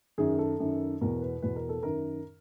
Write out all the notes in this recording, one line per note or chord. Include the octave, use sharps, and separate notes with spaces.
F#2 D#3 G#4
A4
F#2 D#3
E2 B2 A#4
B4
E2 B2 B4
A#4
A4
F#2 D#3 A#4